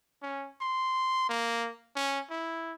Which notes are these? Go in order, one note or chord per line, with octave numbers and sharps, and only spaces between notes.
C#4
C6
A#3
C#4
E4